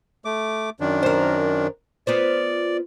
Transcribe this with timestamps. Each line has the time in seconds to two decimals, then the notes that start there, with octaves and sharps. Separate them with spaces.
0.25 A3 D6
0.80 F#2 D#3 D4
1.03 A#4 C5
2.07 B3 F4 C5 D5